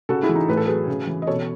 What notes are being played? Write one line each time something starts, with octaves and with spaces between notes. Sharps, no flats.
C#3 F#4 A4
E4 G#4
E3
D#4
A2 B4
A4
F#3 G#4 B4
C#3
E3
D#5
B2 A4 C#5